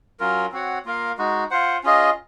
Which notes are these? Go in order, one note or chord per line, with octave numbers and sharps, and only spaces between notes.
F#3 C#4 F4 A#4
C4 F#4 C#5 F#5
A#3 F4 A#4 F5
G#3 D#4 F#4
F4 C5 F#5
C#4 F4 G#4 D#5